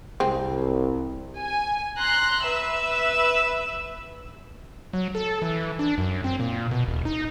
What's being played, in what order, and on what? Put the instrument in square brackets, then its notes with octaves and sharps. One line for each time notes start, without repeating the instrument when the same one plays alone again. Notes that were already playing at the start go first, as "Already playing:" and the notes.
[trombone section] C2 [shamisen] G#3 C4
[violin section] G#5
A#5 C6 F#6
B4 E5 E6
[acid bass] F#3
A4
E3
D4
F#2
C4
A#2
B2
D#1
D#4